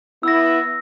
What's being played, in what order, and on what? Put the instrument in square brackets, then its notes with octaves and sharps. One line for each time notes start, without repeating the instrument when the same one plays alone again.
[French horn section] B3 E4 [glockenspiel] E6 A#6